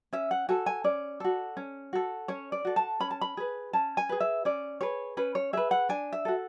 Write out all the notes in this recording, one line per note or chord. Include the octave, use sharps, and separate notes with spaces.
C#4 E5
F#5
F#4 A4 G#5
G#5
C#4 D5
F#4 A4
C#4
F#4 A4
C#4 C#5
D5
F#4 A4
A5
C#4 B5
A5
B5
G#4 B4
C#4 A5
G#5
G#4 B4
E5
C#4 D5
G#4 B4 C#5
C#4 B4
C#5
G#4 B4 E5
F#5
D4 G#5
E5
F#4 A4